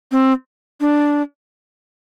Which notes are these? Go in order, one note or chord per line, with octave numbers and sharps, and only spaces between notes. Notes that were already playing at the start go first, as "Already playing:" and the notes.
C4
D4